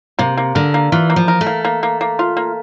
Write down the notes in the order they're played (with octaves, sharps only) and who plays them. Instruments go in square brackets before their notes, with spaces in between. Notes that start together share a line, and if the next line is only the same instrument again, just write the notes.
[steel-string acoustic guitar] C3 [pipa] A#3
[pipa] A#3
[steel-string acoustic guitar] D3 [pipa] A#4
[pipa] A#3
[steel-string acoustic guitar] E3 [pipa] F4
[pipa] A#3
[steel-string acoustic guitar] F3
[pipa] A#4
[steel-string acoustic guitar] A3
[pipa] A#3
A#3
A#3
A#3
F4
A#3